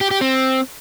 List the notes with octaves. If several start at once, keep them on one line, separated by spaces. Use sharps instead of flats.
G4
G4
C4